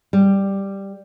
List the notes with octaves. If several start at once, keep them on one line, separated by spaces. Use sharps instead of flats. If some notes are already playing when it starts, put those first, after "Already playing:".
G3